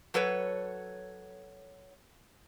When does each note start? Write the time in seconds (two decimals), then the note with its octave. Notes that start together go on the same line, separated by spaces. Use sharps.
0.14 F#3 A4 B4 C#5